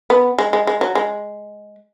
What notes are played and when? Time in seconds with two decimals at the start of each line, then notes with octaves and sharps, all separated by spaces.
0.10 B3
0.38 G#3
0.53 G#3
0.67 G#3
0.81 F#3
0.95 G#3